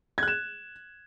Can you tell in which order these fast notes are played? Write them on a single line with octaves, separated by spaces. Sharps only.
G#6 F#6 E7